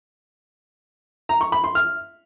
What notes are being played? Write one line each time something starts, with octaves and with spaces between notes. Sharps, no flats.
A#5
C#6
B5
C6
F6